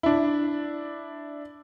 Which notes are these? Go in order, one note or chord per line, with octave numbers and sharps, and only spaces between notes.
D4 E4